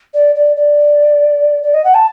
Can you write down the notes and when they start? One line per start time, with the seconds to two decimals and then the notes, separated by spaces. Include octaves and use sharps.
0.14 D5
0.35 D5
0.56 D5
1.63 D5
1.74 D#5
1.84 F#5
1.94 A5